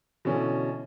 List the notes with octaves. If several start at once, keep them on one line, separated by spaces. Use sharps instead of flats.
B2 D3 E3 C#4